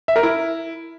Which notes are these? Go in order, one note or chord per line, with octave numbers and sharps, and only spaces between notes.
E5
A#4
E4